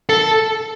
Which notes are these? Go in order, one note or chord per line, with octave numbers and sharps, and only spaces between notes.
A4